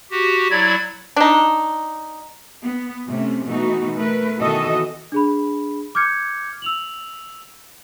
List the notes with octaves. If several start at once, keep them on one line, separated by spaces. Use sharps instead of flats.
F#4 G4
F#3 E4 D5 G#6
D4 D#4
B3
C3 A3 C#4
B2 E3 A3 D#4 F#4
A3 A#4 B4
B2 D#3 E3 F#4 A4 D#5
D4 G#4 B5
D6 F6 G6 G#6 C#7
E6 F7 F#7